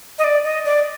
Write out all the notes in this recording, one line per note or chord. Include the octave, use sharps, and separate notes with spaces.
D#5
D5
D#5
D5